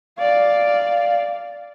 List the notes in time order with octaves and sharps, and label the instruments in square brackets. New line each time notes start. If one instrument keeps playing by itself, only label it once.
[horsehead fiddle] D5 F5